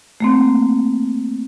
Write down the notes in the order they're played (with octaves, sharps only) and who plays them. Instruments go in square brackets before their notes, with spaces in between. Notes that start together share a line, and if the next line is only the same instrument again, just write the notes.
[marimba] A3 A#3 C4